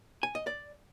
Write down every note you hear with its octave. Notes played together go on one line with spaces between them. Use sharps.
G#5
D#5
D5